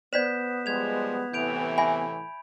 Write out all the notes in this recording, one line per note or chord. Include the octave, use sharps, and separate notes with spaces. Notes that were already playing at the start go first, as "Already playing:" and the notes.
B3 C5 D5 G6 B6 E7
F3 G3 G#3 G#6 F7
A2 C3 E3 G6 D7 F7
E5 F#5 G#5 B5